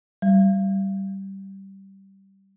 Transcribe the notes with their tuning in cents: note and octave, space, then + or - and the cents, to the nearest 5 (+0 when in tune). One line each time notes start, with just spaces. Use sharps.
G3 -15